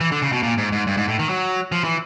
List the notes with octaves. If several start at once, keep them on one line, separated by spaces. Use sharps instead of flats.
E3
D3
C#3
B2
A#2
G#2
G#2
G2
G#2
A2
D#3
F#3
F3
E3